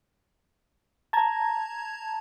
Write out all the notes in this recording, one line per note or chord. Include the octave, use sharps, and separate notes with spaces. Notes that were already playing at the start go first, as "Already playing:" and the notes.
A5 A#5 G#6